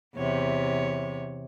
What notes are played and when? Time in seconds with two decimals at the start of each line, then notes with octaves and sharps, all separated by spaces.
0.16 E2 C3 C#5